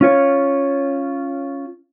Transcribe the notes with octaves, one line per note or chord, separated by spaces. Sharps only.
C#4 F4 C#5